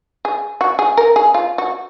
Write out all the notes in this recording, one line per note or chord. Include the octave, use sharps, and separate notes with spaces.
G#4
F#4
G#4
A#4
G#4
F4
F#4